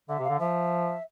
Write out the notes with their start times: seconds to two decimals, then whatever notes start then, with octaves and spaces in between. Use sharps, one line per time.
0.09 D3 E5
0.19 C3
0.24 F5
0.29 D3
0.39 F3 E5